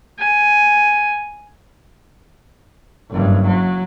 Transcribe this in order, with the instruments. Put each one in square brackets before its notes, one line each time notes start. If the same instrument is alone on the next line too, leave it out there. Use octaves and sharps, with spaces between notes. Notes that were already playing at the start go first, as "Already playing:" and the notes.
[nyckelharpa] G#5
[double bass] F#1 G2
F#3